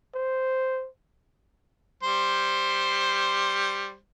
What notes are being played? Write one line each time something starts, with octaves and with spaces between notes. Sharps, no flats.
C5
G3 C5